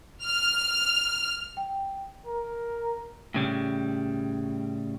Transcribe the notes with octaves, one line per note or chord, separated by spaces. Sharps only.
F6
G5
A#4
A2 C#3 G3